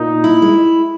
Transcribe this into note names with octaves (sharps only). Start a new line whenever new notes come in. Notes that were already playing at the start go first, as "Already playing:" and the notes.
Already playing: A#2 A#3 D#4
E4
G#3